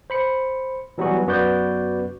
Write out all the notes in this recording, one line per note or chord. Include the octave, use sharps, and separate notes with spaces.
C5 B5 C#7
E3 F#3 G3 B3 F#4 G#5
F#2 B3 F#4 B4 D5 G6